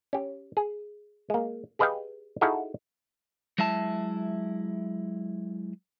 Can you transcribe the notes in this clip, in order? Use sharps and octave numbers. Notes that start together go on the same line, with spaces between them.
C#4 G4
G#4
G#3 A#3
G4 G#4 B4 D#5 F5 G5
D#4 E4 F#4 G#4 A4 F5
F#3 G#3 E4 E5 A5